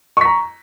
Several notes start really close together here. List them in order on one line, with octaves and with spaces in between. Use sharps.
C#6 B6 A#5